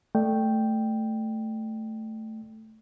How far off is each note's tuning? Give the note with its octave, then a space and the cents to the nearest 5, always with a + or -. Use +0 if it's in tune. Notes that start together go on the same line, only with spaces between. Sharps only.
A3 +0 D5 +25 G5 +0